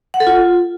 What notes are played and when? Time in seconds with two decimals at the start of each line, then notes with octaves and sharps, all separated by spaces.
0.14 F#5
0.20 A4
0.27 F4